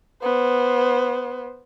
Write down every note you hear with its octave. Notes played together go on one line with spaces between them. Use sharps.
B3 C5